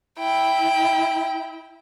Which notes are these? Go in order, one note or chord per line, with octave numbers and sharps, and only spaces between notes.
E4 G5